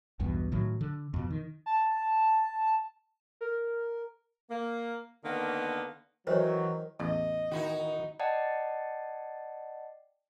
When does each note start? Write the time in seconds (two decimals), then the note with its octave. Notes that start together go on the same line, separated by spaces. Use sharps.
0.20 B1 E2 G2 B2
0.52 A2 D#3 F#3
0.81 D3
1.14 F2 B2
1.31 D#3
1.66 A5
3.41 A#4
4.50 A#3
5.24 D3 D#3 A#3 B3
6.27 D#3 E3 F#3 C5 C#5
7.00 A1 E2 D#5
7.51 D#3 D#4 E4 F#4
8.20 D5 D#5 F#5 G5 A5